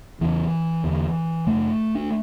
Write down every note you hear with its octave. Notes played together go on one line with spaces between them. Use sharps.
E2 C#3 E3
E2 D3
F#2 C#3 A3
D4